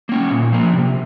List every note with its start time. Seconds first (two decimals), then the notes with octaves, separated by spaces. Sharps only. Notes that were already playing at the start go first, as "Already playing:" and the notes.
0.09 A#3 C#4
0.30 A#2
0.52 F3 A#3
0.74 C3